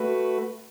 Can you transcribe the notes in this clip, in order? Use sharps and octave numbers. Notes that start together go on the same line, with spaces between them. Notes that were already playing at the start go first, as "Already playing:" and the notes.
Already playing: A3 F#4 B4